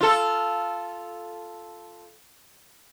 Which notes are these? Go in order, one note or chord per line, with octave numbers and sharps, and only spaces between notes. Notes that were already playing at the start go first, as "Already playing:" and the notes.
F4 A4